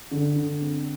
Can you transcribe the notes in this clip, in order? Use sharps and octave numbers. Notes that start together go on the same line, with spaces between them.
D3
D3
C4